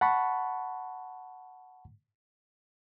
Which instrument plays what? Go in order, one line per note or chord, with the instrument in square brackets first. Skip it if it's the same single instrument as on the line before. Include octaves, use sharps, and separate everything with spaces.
[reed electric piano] F#5 A5 B5 C#6